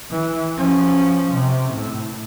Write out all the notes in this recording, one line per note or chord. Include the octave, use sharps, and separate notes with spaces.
E3
F3 C#4
C3
A2